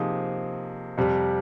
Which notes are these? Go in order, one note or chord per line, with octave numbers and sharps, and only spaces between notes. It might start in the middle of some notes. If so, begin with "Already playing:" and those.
Already playing: C3 F3 A#3 D#4 G#4
F2 C3 G3